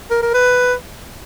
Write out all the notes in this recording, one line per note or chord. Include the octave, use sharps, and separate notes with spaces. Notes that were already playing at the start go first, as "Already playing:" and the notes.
A#4
A#4
B4